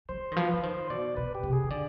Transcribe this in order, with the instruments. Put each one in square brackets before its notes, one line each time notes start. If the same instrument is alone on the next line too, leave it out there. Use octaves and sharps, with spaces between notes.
[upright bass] G3 [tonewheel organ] C5
[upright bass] D#3
[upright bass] F3 [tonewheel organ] B4
[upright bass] F3
[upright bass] D#3 [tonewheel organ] C5
[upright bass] B2 [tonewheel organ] D5
[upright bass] B2 [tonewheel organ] B4
[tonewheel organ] G4
[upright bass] C3
[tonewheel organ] G#4
[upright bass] D#3
[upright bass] D3 [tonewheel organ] D5